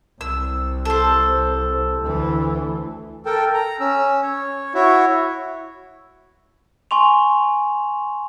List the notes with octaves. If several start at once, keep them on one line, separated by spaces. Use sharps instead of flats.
C2 E6
A4 C5
D2 E3
A4 A#4 G5 A5
A#5
C#4 E6
C#5
E4 F#4 C#5 E5
G#5 C6 C#6 F7